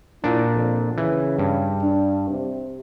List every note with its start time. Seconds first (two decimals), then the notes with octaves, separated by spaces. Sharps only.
0.24 A#2 D4 E4
0.53 F2
0.98 C#3 E3
1.38 G2
1.82 D4
2.31 C3